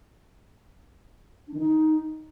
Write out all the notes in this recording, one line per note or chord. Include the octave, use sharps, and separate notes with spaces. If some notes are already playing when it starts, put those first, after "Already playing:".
D4
D#3
D#4